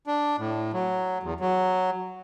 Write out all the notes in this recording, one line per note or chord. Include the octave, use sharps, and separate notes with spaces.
D4
A2
F#3
E2
F#3